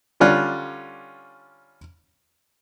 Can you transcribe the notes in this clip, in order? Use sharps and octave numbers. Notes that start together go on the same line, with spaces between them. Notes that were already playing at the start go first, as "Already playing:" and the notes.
D3 G3 C#4 F4 F#6